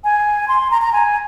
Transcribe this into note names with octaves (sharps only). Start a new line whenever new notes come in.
G#5
C6
A#5
A#5
G#5